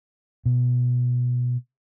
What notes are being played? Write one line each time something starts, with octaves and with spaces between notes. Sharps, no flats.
B2